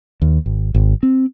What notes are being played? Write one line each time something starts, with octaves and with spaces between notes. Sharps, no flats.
D#2
G#1
G#1
C4